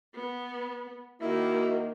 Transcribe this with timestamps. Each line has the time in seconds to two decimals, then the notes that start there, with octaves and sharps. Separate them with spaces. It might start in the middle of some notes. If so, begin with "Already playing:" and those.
0.15 B3
1.21 D#3 A#3 E4 F#4 D#5